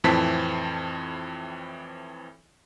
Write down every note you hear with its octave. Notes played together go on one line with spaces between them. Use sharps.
F2 A2 E3 C4 A5 B6